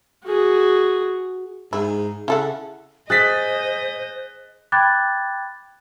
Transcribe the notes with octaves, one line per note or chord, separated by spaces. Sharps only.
F#4 G#4
G#2 E4
C#3 E4 A4 F#5
G#4 C5 D#5 F#6 A6 B6
G5 B5 D6 F#6 G#6 A6